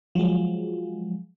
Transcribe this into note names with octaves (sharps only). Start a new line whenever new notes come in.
F3 F#3 G#3